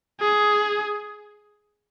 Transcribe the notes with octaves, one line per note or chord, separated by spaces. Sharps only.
G#4